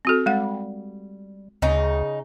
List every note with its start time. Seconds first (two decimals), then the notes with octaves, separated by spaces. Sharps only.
0.05 C4 F#4 A4
0.26 G3 G#3 F#5
1.62 D2 C#3 D#4